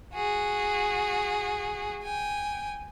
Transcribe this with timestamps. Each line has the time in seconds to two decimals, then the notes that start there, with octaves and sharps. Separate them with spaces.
0.14 F#4 G#4
2.03 G5 G#5